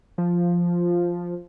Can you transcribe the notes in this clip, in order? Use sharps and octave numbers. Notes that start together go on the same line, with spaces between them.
F3